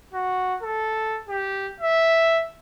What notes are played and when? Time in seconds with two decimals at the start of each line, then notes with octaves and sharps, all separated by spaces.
0.13 F#4
0.63 A4
1.29 G4
1.80 E5